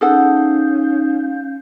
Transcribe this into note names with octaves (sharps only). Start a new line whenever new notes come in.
C#4 D#4 G#4 A4 F5 F#5 G6